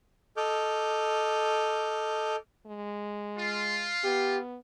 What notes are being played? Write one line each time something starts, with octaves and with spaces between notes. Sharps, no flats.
A4 D#5 D6 F6 G6
G#3
F4
B3 G4